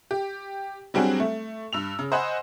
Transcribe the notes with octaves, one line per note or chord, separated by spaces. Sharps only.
G4
F#3 G3 C4 D4 F#4 G#4
A3
G2 E6 F7
C#3
C5 D#5 F#5 G#5 B5